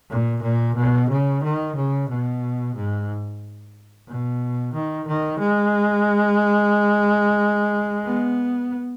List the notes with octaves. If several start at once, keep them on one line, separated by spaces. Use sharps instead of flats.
A#2
A#2
B2
C#3
D#3
C#3
B2
G#2
B2
D#3
D#3
G#3
B3